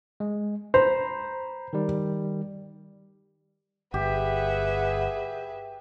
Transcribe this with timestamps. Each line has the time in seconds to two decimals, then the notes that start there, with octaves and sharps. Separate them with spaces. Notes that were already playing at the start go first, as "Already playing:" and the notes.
0.20 G#3
0.74 C5 A#5 B5
1.73 D#3 G3
3.94 G1 G4 G#4 B4 E5 F#5